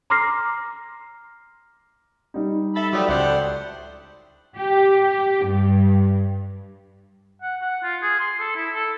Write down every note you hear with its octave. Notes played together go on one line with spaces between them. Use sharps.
A#5 C6 D6 F6 A#6 C7
G3 D#4
A4 E5 B5 A6 B6
F3 F#3 A3 G4 A4 B4 D5 D#6
C#2 A2 D4 G4 A4 C5 F#5
G4
G2
F#5
F#5
F4
G#4
C6
A4
E4
A4